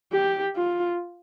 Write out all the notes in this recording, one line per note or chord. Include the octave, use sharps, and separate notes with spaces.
G4
F4